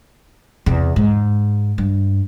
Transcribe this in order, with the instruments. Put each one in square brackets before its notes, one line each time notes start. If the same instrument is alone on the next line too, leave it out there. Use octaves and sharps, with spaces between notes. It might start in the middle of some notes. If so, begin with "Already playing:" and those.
[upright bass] E2 C3
G#2
G2